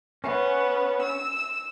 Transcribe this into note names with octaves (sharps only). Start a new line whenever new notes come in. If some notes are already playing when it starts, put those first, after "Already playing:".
B3 C#4
E6